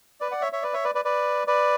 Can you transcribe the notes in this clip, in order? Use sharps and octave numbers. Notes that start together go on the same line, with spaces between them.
B4 D5
D5 F#5
C#5 E5
C#5 E5
B4 D5
C#5 E5
B4 D5
B4 D5
B4 D5
B4 D5